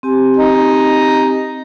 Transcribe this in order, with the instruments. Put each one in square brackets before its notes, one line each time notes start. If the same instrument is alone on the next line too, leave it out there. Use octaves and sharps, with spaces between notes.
[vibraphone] C4 G4 G#5
[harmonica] D#4